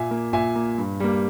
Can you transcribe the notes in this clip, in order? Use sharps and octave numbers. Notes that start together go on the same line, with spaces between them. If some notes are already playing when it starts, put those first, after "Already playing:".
Already playing: A#2 E5 G#5
A#3
A#2 E5 G#5
A#3
G2
G3 A#3